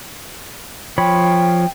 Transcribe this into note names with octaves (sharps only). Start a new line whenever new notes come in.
F3 C#5 G5 B5